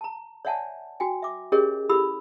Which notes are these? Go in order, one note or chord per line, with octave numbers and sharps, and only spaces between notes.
A5 A#5
C#5 D5 E5 F#5 G#5 A5
F#4 G5 G#5
E5 D6
C#4 G4 G#4 A#4 C#5 D#5
E4 G4 A4 B5 E6